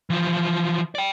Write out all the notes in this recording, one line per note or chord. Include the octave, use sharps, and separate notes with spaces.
E3 F3
D5 G5